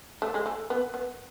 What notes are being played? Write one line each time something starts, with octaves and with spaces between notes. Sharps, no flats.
A3
G#3
A3
B3
B3